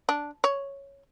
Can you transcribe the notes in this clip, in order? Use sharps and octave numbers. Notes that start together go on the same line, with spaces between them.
D4
C#5